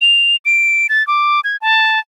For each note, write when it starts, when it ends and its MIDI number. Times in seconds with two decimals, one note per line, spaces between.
0.01 0.36 101
0.45 0.87 98
0.89 1.06 93
1.07 1.40 86
1.44 1.57 92
1.62 1.99 81